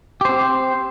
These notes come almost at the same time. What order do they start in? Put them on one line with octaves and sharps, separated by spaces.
G4 C5 C4